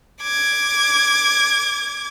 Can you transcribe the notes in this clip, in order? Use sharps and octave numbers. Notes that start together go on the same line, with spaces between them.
D6 G#6